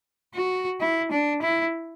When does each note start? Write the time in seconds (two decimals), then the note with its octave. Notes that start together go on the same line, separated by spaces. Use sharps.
0.35 F#4
0.81 E4
1.12 D4
1.42 E4